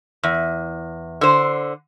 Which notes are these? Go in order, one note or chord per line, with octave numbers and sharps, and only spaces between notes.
E2
D3 C5